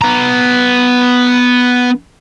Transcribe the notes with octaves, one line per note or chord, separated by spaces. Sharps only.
B3 A#5